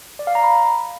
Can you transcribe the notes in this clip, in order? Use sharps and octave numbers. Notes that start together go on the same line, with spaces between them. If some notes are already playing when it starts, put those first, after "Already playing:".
D5
F5
A#5
B5